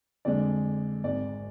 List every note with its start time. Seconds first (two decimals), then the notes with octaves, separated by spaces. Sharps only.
0.25 F2 D3 G#3 D5
1.04 G#1 G#2 G#3 D5